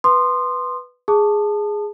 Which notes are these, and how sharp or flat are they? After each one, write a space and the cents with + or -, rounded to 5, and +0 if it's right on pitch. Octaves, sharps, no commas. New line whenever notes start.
B4 +0 C6 +0 D#6 -30
G#4 +0 A5 +0 D#6 -35